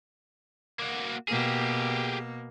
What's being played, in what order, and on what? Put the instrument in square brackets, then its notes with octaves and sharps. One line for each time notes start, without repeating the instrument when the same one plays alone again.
[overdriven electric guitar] A#3 F#4
[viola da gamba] B2 A#3 [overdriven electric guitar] G4 G#4